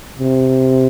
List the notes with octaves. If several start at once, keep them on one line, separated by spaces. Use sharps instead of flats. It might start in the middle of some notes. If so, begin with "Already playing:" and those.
C3